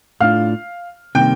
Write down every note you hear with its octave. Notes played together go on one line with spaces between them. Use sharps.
A2 A3 D4 F4 F5 F6
C3 D#3 G3 A#3 G5 G6